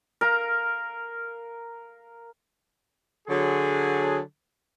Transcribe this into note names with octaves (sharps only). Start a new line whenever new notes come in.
A#4 F5 A#5
D3 F#3 G#4